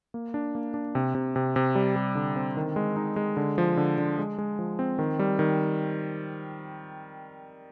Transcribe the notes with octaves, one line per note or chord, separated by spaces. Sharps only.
A#3
D4
A#3
D4
C3
C3
C3
C3
G3
G3
D3
C4
D#3
G#3
D#4
G#3
D3
F3
D3
D3
G#3
G#3
F3
C4
D#3
G3
D#3